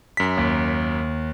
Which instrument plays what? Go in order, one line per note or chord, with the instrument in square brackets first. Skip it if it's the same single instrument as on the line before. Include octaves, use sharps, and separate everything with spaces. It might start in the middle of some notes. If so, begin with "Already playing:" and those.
[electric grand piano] F#2 B6
[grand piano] D#2